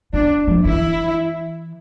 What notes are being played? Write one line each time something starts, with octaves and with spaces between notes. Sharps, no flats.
B3 D4
F3
E3 E4